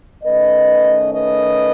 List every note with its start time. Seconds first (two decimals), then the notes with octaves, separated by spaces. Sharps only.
0.24 D#3 A3 C#4 B4 D#5
1.12 B4 D#5